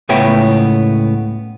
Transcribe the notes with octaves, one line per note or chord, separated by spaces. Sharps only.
C#2 A2 B3 C#5 E5 G5